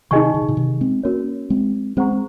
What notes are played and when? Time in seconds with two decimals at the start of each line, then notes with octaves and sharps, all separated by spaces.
0.11 C3 D#3 D#4 G#4 D#5 G#5 C#6
0.34 C#3
0.42 C3
0.48 A#2 C#3
0.57 C3 D#3
0.81 G#3 C4
1.04 A#3 C#4 F#4 A#4 C#5
1.50 G#3 C4
1.97 G#3 C4 G#4 C5 F#5 A#5 C#6
2.13 C4